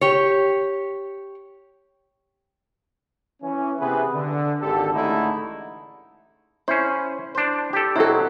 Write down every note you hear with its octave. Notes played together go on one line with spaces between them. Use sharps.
G4 C#5
E3 C#4
C3 E3 B3 G#4 B4
D3
G#1 D3 G4 A4
A1 D3 G#3 A3 D#4 E4
C#4 E4 C5
D4 C5
G4 A4
B2 F#3 C4 E4 A4